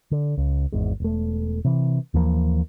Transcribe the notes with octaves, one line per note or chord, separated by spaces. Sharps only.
D3
C#2
G#1 E2 G#2
E1 A3
C3 E3
D#2 E3 F3 A#3